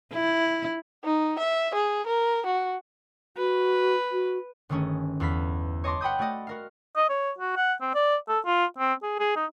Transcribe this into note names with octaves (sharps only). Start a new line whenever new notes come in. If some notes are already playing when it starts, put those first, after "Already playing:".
E4
D#4
E5
G#4
A#4
F#4
F#4 B4
F#4
G1 D#3 A3 C#4 G#4
E2 A4 F5 B5 B6
C#5 D#5 A5 C6 D6 A#6
F#5 G5 B5 D#6 G6
A3 F#4 D5 D#5
F#4 A#4 F5
D#5
C#5
F#4
F#5
C4
D5
A4
F4
C4
G#4
G#4
D#4